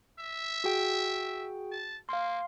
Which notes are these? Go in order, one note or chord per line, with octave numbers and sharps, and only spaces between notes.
E5
F#4 G#4 G5
A5
A#3 F5 C6